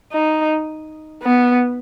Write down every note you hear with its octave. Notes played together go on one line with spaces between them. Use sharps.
D#4
B3